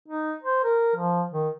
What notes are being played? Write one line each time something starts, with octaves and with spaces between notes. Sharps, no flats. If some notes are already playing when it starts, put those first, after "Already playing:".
D#4
C5
A#4
F3
D#3